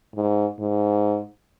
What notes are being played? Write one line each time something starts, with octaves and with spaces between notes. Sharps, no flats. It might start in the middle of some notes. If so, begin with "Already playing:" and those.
G#2
G#2